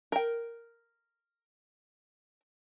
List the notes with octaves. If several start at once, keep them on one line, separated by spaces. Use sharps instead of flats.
A#4 G5